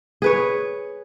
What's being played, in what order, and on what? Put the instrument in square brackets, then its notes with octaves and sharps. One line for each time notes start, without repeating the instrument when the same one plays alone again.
[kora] G#4 B4 C#5